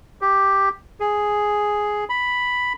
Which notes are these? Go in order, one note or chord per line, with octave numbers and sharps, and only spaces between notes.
G4
G#4
B5